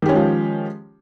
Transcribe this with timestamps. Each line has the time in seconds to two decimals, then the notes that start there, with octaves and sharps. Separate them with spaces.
0.02 D#3
0.06 G4
0.09 C#4
0.12 G#3
0.15 F3